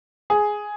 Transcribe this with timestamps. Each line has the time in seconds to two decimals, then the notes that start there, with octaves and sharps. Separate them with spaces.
0.30 G#4